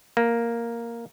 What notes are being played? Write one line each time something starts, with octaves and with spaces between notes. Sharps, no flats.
A#3